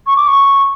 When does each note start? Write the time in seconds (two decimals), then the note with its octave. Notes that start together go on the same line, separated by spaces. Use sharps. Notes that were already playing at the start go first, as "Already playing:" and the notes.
0.07 C#6
0.17 D6
0.27 C#6